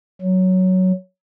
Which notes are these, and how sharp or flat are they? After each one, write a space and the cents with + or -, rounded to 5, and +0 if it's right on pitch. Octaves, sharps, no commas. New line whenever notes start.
F#3 +5